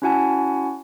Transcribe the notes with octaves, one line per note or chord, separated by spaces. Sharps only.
C#4 E4 F#4 F#5 G#5 A5